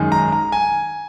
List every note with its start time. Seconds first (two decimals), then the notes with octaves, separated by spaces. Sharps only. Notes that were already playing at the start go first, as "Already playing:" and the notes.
Already playing: F#2 D#3 G#3
0.12 A#5
0.32 A#5
0.52 G#5